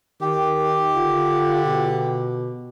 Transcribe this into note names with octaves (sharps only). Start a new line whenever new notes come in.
D#3 G4
D3 F4
B2